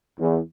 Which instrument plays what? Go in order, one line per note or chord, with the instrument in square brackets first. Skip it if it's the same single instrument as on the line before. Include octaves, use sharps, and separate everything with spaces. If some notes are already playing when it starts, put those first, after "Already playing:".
[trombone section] E2